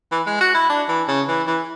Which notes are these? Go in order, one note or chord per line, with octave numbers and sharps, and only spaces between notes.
E3
G#3
F#4
E4
D4
E3
C#3
E3
E3